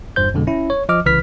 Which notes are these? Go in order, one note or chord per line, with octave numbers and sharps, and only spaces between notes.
G1 E2 G2 C5 G6
F2 B2 D3 G#3
C#4 E4
C#5
F3 D#5 D6 F6
C2 C#3 E3 B4 F6 B6